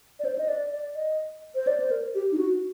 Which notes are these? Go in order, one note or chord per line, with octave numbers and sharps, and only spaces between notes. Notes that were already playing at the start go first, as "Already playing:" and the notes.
D5
C5
D#5
D5
D5
D#5
C5
D5
C5
A#4
G4
D#4
F#4